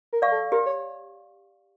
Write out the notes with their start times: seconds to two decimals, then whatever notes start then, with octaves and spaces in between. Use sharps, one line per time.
0.13 A#4
0.22 D5 F5 C#6
0.32 A4
0.52 G4 A#4
0.66 C#5